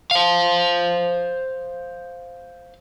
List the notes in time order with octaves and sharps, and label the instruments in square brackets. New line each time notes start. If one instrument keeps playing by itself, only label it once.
[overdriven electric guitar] C5 F5